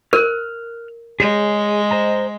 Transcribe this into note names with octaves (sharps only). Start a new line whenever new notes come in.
A#4 F6 F#6
G#3 G#4 C#5 G6
C5 D#5 A#5